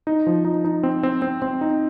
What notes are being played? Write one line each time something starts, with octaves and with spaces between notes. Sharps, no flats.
D#4
F3
D#4
D#4
C4
C4
C4
C4
D#4